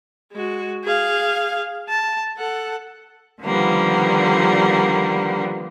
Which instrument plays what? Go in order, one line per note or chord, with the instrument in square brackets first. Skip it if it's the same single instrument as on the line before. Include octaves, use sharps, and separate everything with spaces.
[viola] G#3 F#4
G#4 F5
A5
A4 F#5
[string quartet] D3 D#3 F3 G3 A#3 B3